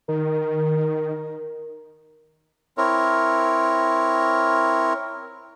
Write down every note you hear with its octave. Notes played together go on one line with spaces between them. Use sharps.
D#3 A#4
C4 E4 A#4 C#5